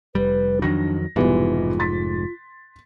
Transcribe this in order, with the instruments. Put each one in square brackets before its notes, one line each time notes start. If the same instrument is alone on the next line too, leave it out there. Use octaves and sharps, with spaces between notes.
[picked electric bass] F1 G3 [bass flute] B4
[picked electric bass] F2 D#3 F#3 [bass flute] D4 [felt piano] A#6
[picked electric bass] F1 G#2 [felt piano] B2 E3 G3 [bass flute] F4
[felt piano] C6 A6 B6